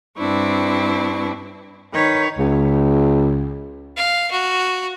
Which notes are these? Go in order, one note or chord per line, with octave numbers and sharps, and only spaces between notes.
G2 C4 D4 E4 B4 C#6
D#3 B4 C#5
C#2
F5
F#4